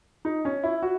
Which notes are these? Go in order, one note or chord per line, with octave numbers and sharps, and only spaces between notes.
D#4
C#4
E4
F#4